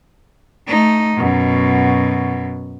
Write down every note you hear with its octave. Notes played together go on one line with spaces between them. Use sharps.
A3 D#4
F#2 B2